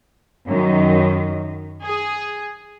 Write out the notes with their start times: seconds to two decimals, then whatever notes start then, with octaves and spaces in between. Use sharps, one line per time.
0.47 F#2 D#3
1.85 G#4